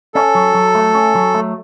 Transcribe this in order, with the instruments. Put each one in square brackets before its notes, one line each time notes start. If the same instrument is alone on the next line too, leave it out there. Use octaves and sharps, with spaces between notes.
[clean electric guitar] C#4 [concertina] A4
[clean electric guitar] F#3
F#3
A3
C#4
F#3
A3